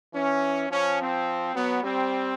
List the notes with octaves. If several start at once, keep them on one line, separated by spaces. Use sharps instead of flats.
E3 C#4
F3 C#4
C4
F#3 B3
G3 C4